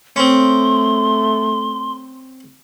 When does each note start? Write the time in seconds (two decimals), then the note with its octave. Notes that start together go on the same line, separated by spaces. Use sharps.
0.16 A3 C4 C#4 C6